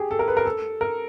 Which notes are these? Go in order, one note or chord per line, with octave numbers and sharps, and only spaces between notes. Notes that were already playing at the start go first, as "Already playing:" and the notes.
Already playing: G4 G#4
A4
A#4
B4
A#4
A4
A#4